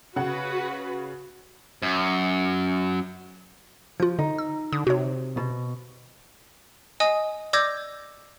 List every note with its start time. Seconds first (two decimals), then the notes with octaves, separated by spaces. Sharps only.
0.16 C#3 F#4 B4 F#5 F#6
1.82 F#2
4.00 F3 F4 G6
4.19 D3 D#4
4.38 E6
4.72 D3 D#6
4.87 C3 F#4 C#5
5.37 B2
7.00 D#5 G#5 D#6
7.53 D5 D6 E6 G6 G#6 A#6